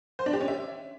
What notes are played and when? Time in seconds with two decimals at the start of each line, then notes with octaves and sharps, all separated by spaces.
0.19 C5
0.26 D4
0.33 G4
0.41 C#4
0.48 E5